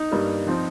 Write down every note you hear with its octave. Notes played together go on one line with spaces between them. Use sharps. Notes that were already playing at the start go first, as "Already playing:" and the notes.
Already playing: D#4
G2 G3 A#3
F3 C4 D#4